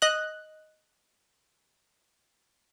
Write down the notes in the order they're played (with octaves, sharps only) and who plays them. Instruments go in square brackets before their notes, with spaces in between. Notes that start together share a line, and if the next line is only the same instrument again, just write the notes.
[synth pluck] D#5 F#6